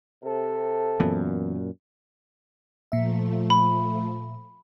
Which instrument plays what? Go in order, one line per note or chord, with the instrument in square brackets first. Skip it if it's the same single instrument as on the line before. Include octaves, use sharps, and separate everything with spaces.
[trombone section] C3 A4
[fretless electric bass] F#2 A#2 [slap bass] E3 B3
[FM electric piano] A#2 E5 [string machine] F3 A3
[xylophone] B5